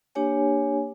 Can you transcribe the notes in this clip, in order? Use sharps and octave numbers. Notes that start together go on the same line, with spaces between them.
A#3 D4 G4 C#5 G#5